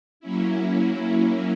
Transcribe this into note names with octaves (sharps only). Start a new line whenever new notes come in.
F#3 A#3 C#4 E4